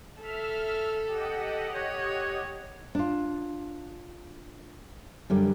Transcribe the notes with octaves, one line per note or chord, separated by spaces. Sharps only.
A4 E5 F6
G4 D#5 F#5
C#5
D4 F4
F#2 D3 G3